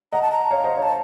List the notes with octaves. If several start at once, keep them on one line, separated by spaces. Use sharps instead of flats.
D#5 F#5 A#5
A5
A#5
C#5 F5
C5 D#5
C#5
A5